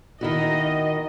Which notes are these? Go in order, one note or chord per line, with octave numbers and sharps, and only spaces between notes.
D#3 E4 F#4 D#5